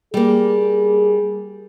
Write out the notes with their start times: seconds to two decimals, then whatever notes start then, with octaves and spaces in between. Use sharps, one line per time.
0.14 G3 A#3 G#4